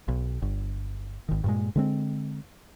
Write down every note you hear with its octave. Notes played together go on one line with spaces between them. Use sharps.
B1
G1
G#1 D#3
G2 A#2 G#3
D3 G#3 C4